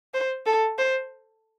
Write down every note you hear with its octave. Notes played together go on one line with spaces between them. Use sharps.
C5
A4
C5